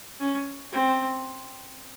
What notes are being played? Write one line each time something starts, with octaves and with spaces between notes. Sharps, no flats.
C#4
C4